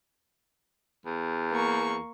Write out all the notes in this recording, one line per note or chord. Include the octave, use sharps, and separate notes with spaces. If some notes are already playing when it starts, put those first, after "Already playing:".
E2
A#3 C#6